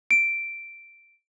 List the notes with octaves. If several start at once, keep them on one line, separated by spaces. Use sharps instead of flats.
D7